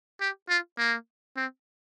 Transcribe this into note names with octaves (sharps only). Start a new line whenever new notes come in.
G4
F4
A#3
C4